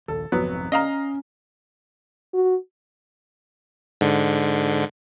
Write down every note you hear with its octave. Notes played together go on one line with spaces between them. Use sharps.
A#1 D#2 A4
G#1 F2 C3 F#3 B3
C#4 D#5 F5 A#5
F#4
G#2 D3